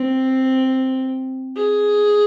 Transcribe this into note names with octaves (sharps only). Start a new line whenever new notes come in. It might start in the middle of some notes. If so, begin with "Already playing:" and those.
Already playing: C4
G#4